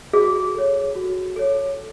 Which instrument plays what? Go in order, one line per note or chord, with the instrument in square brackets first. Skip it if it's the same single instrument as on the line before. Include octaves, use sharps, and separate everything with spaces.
[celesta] F#4 [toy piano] G#4
[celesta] A4 C#5
F#4
A4 C#5